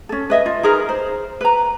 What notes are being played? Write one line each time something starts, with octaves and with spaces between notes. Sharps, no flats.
C#4 A4
B4 D#5 E5
F4
D#4 G#4 A#4 B4
C5
B4 A#5